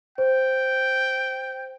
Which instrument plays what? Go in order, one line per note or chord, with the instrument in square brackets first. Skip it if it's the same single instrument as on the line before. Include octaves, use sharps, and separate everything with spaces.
[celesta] C5 [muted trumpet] G5